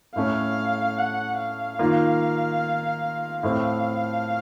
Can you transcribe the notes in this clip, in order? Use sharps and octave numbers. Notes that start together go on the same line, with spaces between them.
A2 A3 C#4 F5
F#5
F5
D#3 A#3 F4
A2 A3 C4 F5